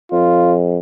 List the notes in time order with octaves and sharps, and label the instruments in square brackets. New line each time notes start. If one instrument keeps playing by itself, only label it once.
[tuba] F2 [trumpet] F4